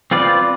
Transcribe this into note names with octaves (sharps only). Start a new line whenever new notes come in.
C4 F4 B4 D5